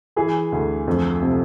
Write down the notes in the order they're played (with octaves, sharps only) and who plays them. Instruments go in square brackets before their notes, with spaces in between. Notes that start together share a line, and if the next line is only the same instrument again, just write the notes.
[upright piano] E3 G#4
D2
F2
C3